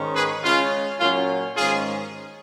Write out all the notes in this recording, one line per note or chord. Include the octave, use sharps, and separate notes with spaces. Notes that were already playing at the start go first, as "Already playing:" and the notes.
Already playing: G#2 D#3 G#3 C#4
G#4 B4
C#3 G#3 C#4 F4
A#2 F#3 C#4 F4
G#2 D#3 G#3 C#4 F4 G#4